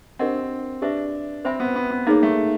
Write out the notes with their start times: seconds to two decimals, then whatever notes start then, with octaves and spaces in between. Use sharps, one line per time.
0.19 C4 D4 G4 A#4 D#5 F#5
0.82 D4 G4 B4 E5
1.45 C4 C5 E5 G#5 B5
1.60 B3
1.76 B3
1.91 B3
2.07 A#3 D#4 G#4 C#5
2.23 A3